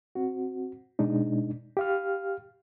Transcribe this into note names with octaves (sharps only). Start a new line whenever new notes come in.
C4 F#4
B2 G#3 D4 D#4
G4 F5 F6